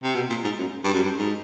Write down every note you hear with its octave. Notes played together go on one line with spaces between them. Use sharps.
C3
B2
A#2
G#2
F#2
G2
F#2
G2
G#2